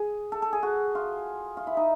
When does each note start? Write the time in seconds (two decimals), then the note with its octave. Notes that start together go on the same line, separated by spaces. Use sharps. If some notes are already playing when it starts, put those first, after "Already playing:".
Already playing: G#4
0.32 A4
0.42 A4
0.53 G#4
0.63 F#4
0.95 F4
1.57 F4
1.67 E4
1.77 D#4